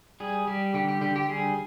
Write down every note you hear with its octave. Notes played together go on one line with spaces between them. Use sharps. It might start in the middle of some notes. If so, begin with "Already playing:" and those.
G3 G#4
G3 G4
D3 G4
G4
D3 G4
G4
G3 G#4